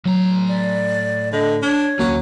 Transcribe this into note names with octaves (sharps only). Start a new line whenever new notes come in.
A2 F#3 A#5
D5
D3 D#5
D4 C#5
D2 F#3 A#3 C#4